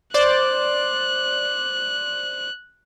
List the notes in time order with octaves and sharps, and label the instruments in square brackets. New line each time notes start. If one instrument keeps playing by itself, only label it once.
[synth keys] C5 D5 [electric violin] F#6